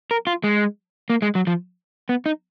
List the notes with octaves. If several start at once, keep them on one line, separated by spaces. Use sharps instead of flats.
A#4
F4
G#3
A#3
G#3
F#3
F3
B3
D#4